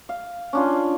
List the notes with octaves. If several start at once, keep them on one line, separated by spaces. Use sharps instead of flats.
F5
C#4 D4 F4